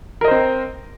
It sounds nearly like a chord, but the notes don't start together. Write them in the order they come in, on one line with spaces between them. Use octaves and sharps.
A#4 D#5 C5 C4